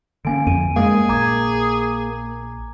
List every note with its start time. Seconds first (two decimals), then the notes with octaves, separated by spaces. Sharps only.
0.25 D3 A#3 C#4 G#5 D7
0.47 F2 D#7
0.76 G2 G#3 A#3 G#4
1.09 A#1 A#5 D6 G#6